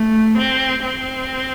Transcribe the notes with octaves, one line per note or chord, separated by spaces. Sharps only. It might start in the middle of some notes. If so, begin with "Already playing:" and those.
Already playing: A3
C4
C4